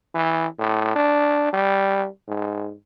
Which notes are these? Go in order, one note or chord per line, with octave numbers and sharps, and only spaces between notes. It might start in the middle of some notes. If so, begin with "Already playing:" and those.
E3
A2
D4
G3
G#2